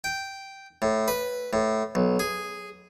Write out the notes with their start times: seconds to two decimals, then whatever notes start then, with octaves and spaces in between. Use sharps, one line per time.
0.04 G5
0.82 A2
1.08 B4
1.53 A2
1.95 B1
2.19 G#4